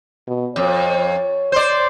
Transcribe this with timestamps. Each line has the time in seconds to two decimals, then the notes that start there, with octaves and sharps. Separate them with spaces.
0.27 B2
0.56 F2 C#5
1.52 C5 D5